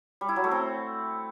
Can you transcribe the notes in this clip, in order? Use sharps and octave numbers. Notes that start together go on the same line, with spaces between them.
G3
E4
F#3
A3
C4